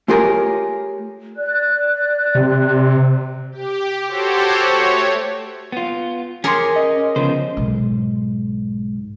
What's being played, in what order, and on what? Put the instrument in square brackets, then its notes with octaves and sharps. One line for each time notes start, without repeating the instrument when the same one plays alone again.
[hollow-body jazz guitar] A3 F4 G4 G#4 A#4 C#5
[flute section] D5 F#6
[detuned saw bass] C3
[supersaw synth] G4
F#4 G4 A4 C5 C#5
A3 C#5
[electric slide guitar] B3 F4
[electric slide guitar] C#4 [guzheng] G#4 A#4 [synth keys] C6 D6 C#7
[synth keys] D#5
[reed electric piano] C#3 [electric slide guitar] F3 B3 C5
[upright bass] B1 G#2